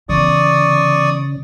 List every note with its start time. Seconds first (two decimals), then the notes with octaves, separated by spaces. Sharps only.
0.09 C#3 E3 B3 D5 C#6 D#6